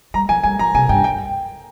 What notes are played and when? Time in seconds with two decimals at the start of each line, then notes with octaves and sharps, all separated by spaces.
0.14 G3 A#5
0.29 F3 G#5
0.44 G3 G#5
0.59 F3 A#5
0.74 C3 G#5
0.89 G2 G5
1.04 G5